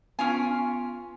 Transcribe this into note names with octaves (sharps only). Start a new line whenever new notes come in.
B3 C#4 F4 G#5 D7